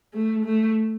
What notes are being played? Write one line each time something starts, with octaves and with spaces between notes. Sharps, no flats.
A3
A3